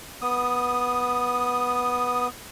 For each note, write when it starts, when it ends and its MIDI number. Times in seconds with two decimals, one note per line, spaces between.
0.22 2.28 59
0.22 2.28 87